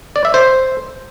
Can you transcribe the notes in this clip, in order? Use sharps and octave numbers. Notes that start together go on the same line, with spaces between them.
D5
E5
C5